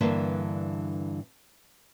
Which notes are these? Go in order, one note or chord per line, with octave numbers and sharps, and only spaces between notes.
G2 D3 E3 A#3 D4